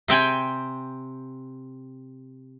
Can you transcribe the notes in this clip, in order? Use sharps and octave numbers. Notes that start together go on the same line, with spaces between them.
C3 C4 G5 G#5